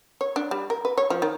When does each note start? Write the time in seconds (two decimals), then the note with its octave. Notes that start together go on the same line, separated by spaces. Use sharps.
0.21 C#5
0.36 D4
0.51 G3
0.70 A#4
0.85 B4
0.98 C#5
1.10 F3
1.22 D#3